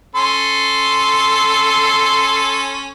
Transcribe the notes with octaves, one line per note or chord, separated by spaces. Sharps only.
C#4 A4 C6